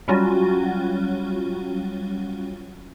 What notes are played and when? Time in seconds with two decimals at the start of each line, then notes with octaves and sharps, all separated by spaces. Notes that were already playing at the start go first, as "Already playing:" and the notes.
0.08 F#3 G3 C#4 F4 F#4